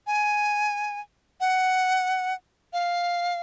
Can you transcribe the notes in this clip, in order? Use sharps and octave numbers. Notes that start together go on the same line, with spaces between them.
G#5
F#5
F5